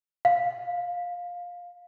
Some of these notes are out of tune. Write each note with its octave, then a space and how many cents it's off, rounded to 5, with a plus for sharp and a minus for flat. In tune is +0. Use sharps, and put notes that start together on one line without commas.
F5 +15